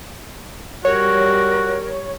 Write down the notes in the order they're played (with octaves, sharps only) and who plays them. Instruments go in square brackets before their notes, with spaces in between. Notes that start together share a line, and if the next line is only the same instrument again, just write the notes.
[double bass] G3 [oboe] F#4 [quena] A#4 [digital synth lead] C#5